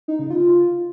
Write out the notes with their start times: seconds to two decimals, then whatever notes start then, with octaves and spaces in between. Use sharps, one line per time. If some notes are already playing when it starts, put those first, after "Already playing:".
0.08 D#4
0.19 C#3
0.30 F4